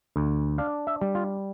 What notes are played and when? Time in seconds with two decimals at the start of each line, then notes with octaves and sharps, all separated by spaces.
0.16 D2
0.58 D4 F5
0.87 E5
1.01 G3
1.15 F4